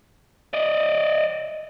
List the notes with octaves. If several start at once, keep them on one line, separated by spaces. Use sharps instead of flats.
D5 D#5